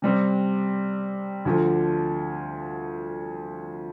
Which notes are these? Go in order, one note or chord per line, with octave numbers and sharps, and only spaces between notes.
C3 G3 C4
D2 D3 F3